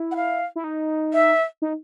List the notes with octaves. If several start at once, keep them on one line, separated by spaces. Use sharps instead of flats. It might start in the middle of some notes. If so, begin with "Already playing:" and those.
Already playing: E4
F#5
F5
E4
D#4
E5
D#4